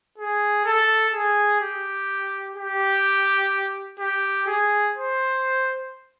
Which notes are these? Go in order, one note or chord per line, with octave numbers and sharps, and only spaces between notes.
G#4
A4
G#4
G4
G4
G4
G#4
C5